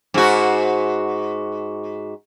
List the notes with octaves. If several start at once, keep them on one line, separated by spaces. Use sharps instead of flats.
G#2 F#4